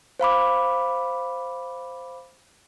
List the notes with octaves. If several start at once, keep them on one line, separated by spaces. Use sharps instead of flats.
C5 F5 B5 D6